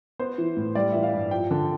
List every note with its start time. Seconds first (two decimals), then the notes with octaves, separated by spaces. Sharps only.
0.19 B3 C5
0.38 E3
0.57 A2
0.75 G3 D5
0.92 E3 E5
1.03 F5
1.13 G2
1.31 F3 G5
1.51 D3 A5